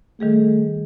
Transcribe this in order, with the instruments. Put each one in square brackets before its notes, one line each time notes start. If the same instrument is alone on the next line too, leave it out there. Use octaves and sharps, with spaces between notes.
[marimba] D#3 G3 G#4 [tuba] A3